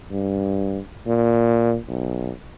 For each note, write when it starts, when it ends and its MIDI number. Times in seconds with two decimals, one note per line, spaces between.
0.11 0.79 43
1.06 1.77 46
1.88 2.31 35